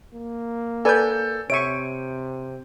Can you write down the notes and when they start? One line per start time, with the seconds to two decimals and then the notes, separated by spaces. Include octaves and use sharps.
0.14 A#3
0.85 A4 B4 D5 G#5 G6
1.50 C3 C#5 E5 C#6 D7 D#7